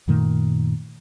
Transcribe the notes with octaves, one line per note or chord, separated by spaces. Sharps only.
F#2 A#2 D#3 A3